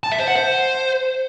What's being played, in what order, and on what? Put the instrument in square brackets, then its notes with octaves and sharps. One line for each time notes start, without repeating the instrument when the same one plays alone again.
[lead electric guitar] A5
E5
C5
F#5
C5